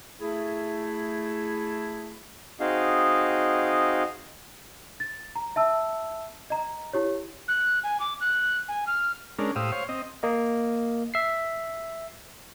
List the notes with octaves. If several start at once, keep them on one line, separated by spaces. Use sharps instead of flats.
A3 E4 G#4
C4 D#4 F#4 G#4 D#5 F5
A6
A#5
E5 A5 E6
D#5 A#5
E4 G4 C#5
F#6
G#5
D6
F#6
G#5
F6
G#3 C#4 D4 A#4
A2 G4 C5 F5 D#6 E6
C5 C#5 F5
C4 D#5
A#3 D#5
E5 C7